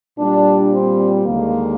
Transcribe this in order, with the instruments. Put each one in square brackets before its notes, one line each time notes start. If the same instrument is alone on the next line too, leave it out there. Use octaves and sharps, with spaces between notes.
[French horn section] A#2 G3 D4
C4
D#2 D3 G#3 A#3